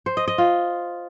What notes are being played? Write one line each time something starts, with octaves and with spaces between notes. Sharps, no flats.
C5
D#5
D#5
F4